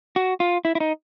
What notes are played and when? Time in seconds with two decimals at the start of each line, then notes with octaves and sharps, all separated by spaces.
0.16 F#4
0.40 F4
0.65 E4
0.75 E4
0.80 D#4